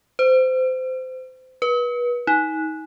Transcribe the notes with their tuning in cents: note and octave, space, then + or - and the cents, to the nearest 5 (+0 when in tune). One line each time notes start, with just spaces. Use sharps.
C5 -25
B4 -30
D#4 +30